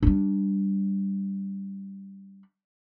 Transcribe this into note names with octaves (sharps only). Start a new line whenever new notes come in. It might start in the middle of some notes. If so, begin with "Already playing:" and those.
G3 D4